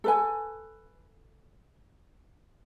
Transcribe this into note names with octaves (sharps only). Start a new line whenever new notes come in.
A4 B4 G#5